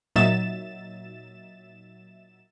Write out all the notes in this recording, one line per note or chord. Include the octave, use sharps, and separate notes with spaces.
A#2 F#3 D#4 E5 A6 E7